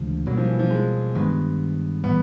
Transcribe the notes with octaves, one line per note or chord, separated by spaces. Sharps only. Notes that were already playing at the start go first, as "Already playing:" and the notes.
Already playing: D2 C#3 E3 F3 G#3
B2 F#3 G3 A#3
F3
E3
F3
G#3
G2 D#3 G#3 B3
A2 E3 G3 B3